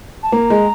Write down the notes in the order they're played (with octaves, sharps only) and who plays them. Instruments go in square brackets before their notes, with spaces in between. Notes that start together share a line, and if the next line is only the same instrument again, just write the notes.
[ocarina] A5
[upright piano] A#3 [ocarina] A#5
[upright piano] G#3